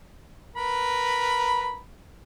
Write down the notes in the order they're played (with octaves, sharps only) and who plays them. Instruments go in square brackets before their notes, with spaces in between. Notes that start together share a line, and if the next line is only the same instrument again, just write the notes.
[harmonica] A#4 B4 B5